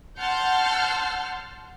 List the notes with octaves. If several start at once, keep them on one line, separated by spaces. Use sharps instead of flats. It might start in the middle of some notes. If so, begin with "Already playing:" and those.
F#5 A5 C6 F6 G6